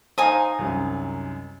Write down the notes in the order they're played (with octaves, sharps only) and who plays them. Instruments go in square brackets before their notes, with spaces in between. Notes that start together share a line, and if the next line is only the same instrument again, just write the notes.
[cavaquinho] D#4 G#5 D#6 [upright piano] C5 F5
[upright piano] C2 F#2